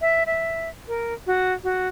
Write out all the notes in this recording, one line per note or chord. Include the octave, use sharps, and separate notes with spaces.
E5
E5
A#4
F#4
F#4